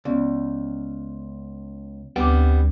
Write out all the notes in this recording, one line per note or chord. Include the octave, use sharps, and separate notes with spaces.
C#2 B3 C#4 D5
D2 G3 B3 C4 G5 D6